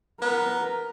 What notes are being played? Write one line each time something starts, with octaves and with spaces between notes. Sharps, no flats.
B3 A#4